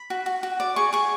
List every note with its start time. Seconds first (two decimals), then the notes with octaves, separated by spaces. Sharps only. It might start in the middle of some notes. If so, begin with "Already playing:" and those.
Already playing: B5
0.10 F#4
0.26 F#4
0.43 F#4
0.60 D5
0.76 G#4 C#6
0.93 G#4 C#6